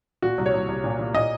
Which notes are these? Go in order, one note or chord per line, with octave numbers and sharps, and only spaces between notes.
A#2 F#4
C2
C#5
C2
C2
A#2
A#2
A#2 D#5